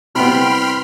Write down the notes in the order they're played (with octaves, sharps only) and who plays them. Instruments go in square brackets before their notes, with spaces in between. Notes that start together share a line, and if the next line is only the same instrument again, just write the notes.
[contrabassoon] C2 [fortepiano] C3 B3 [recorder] G5 [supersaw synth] B5 C6 F6